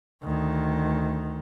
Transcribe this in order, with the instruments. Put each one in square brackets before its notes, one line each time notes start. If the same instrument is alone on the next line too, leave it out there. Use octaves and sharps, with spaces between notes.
[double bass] D2 D#3